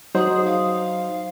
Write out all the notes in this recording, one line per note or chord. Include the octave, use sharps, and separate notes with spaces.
F#3 D#4 G#4 C5
F5